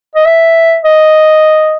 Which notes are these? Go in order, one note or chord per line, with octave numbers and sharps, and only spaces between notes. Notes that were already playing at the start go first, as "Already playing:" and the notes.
D#5
E5
D#5